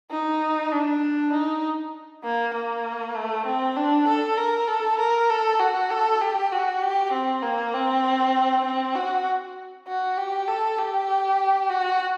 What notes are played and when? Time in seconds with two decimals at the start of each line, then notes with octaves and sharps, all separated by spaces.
0.11 D#4
0.71 D4
1.33 D#4
2.24 A#3
2.54 A#3
3.15 A3
3.46 C4
3.76 D4
4.08 A4
4.37 A#4
4.68 A4
4.99 A#4
5.30 A4
5.60 F#4
5.90 A4
6.21 G4
6.52 F#4
6.82 G4
7.13 C4
7.42 A#3
7.73 C4
8.65 C4
8.95 F#4
9.87 F#4
10.18 G4
10.48 A4
10.78 G4
11.70 F#4